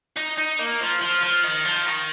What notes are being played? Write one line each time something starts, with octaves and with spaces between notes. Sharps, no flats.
D#4
D#4
A#3
F3
F3
F3
D#3
F3
D#3